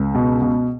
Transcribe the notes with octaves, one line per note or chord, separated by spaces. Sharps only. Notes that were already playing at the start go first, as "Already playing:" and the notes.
Already playing: C#2
B2
B2